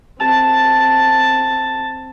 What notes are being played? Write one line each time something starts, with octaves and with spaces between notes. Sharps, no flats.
C4 A5